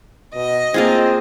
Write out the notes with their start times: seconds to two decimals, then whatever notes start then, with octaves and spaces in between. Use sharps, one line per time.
0.35 B2 D#5
0.74 A#3 C4 F4 G#4